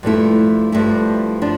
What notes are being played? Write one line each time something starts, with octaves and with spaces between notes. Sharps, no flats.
G2 F3 A3 E4
G2 F3 A3 E4
F3 D4